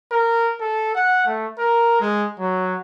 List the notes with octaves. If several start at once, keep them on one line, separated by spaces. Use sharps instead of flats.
A#4
A4
F#5
A3
A#4
G#3
F#3